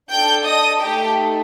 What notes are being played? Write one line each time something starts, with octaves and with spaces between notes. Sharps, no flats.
D4 A4 G5 G6
D#5 D#6
A3 D#4 G4 A4 G5